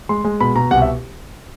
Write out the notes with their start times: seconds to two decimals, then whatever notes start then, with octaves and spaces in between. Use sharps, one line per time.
0.09 G#3 C6
0.25 G#3
0.40 B2 B5
0.55 B2 A#5
0.71 C2 F#5
0.82 E5